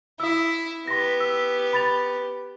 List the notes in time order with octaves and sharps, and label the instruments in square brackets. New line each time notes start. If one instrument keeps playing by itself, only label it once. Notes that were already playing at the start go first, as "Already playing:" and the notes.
[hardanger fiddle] E4 [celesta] D#6 E6
[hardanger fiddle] B3 G4 [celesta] C6 A#6
[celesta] E6
B5 A6 F7